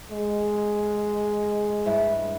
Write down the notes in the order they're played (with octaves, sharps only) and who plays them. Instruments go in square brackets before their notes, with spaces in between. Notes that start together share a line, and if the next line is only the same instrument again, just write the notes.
[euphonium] G#3
[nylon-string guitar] G2 E4 E5